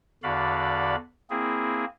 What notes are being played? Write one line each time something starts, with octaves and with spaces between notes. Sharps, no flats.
E2 D3 F#4 D5 F5 B5
A#3 C4 E4 G#4